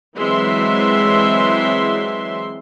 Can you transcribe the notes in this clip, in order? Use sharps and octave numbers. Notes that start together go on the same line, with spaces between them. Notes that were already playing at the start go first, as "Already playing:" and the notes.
E3 F#3 G#3 C4 E5 C6